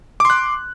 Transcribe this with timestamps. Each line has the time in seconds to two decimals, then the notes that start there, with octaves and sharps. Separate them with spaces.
0.20 D6
0.25 C6
0.30 F#6